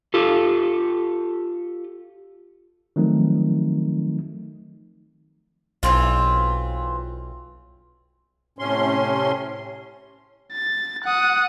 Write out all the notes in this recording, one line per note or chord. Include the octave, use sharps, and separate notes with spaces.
F4 G4 A4
D#3 F3 F#3 A3 C4 D#4
B1 E3 C4 F4
A2 C3 C#4 C6
A6
F#5 D#6